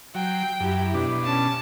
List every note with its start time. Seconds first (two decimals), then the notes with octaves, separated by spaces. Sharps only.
0.15 F#3 G5 G6 C7 D7
0.60 F#2 E4 G4
0.94 B2 D4
1.24 C#4 A5